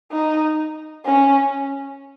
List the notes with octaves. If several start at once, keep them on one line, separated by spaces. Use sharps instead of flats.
D#4
C#4